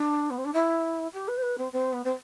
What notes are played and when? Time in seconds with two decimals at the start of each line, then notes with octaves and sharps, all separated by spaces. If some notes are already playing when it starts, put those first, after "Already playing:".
Already playing: D4
0.30 B3
0.38 C4
0.45 D4
0.53 E4
1.13 G4
1.28 B4
1.37 C5
1.42 B4
1.58 C4
1.72 C4
1.93 B3
2.04 C4